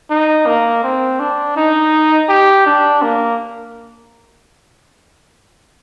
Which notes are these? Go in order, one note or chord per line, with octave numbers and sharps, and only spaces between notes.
D#4
A#3
C4
D4
D#4
G4
D4
A#3